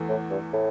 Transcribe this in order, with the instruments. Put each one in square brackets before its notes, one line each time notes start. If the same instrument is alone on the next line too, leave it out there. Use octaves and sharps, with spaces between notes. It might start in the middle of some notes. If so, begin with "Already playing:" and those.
Already playing: [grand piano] E2 E3 A3
[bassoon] A2
G2
A2